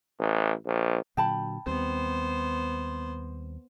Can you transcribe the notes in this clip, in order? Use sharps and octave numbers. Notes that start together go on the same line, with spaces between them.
A1
A#1
A#2 D3 F#3 G5 A5 B5
D#2 G3 B3 C4 C5